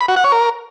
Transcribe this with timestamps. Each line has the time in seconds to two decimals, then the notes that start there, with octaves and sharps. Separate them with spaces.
0.01 B5
0.08 F#4
0.16 F#5
0.24 C#5
0.32 A#4